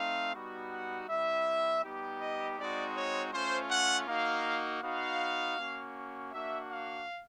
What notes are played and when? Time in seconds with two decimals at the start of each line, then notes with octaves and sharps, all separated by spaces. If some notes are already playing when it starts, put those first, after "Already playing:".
Already playing: A3 C4 D#4 F5
0.34 G3 B3 D#4 F#4
0.71 F#5
1.08 G3 C4 E4 E5
1.84 G3 B3 D#4 G4
2.20 D#5
2.58 G#3 C4 D#4 F#4 D5
2.95 C#5
3.32 A3 C#4 F4 C5
3.70 F#5
4.07 A#3 D#4 F#4 F5
4.82 B3 D#4 F#4 F5
5.57 A#3 C#4 F#4
6.32 A#3 D4 F#4 E5
6.70 F5